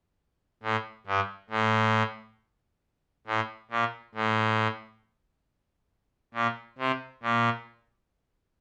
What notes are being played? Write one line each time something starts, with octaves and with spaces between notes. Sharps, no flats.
A2
G2
A2
A2
A#2
A2
A#2
C3
A#2